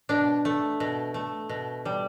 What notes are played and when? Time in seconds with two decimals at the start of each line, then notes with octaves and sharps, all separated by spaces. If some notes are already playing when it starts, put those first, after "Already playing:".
0.09 B2 D4
0.45 A3
0.80 B2
1.14 A3
1.49 B2
1.85 G3